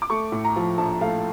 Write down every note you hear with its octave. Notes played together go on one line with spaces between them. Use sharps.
D6
A3 C#6
A2
A#5
F3
A#1 A5
A3 F5